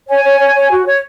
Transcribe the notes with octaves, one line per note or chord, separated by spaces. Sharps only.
C#5 G#5
C#5
C#5
C#5
F#4
C#5